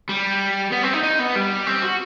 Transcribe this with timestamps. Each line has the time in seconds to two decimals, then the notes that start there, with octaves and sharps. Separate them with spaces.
0.09 G3
0.72 B3
0.83 C4
0.93 D#4
1.03 D#4
1.19 B3
1.35 G3
1.67 C4
1.82 F#4